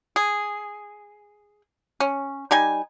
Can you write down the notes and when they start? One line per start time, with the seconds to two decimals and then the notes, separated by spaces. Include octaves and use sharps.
0.16 G#4
2.00 C#4
2.51 G3 D#4 G#5